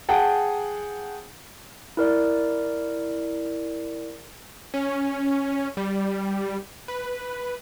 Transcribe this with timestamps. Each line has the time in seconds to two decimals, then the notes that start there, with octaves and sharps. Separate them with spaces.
0.09 G#4 F#5 G5 A5
1.97 E4 A#4 D5
4.74 C#4
5.77 G3
6.88 B4